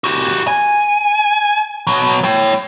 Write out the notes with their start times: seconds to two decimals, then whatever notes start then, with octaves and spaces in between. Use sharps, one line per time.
0.04 F#4 G4
0.47 G#5
1.87 B2 F#3
2.24 C#5 G5